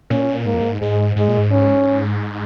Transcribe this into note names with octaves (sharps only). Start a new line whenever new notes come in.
A#2 C#4
G#2 A#3
F2
G#2
G#2 G#3
G#2 G#3
A#2
G#2
C#4